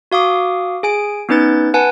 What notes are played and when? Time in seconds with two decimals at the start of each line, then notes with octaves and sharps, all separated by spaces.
0.12 F#4 F5 D6 D#6
0.83 G#4 G#5 D7
1.29 B3 C#4 D#4 B4 G6 A6
1.74 B4 F#5 G#5 A5